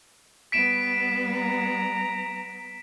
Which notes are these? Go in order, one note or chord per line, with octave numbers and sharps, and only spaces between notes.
G3 B3 B6 D7 E7
A#5